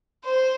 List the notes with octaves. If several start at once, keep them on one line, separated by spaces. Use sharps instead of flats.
C5